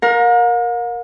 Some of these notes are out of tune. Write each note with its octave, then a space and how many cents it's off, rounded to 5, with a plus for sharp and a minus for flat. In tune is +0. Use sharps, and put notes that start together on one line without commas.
A#4 +10 F5 +45